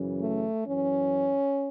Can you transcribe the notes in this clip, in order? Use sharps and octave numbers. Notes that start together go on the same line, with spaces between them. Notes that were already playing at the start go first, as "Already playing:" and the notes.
Already playing: F#2 C#3 E3
A3
F#2 E3 C#4